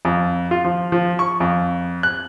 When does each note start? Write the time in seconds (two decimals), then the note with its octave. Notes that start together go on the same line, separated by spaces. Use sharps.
0.05 F2
0.51 F4
0.64 F3
0.92 F3
1.19 C#6
1.40 F2
2.03 F#6